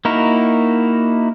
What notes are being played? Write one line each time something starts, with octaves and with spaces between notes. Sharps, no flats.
A#3 D#4 E4 F#4 A#4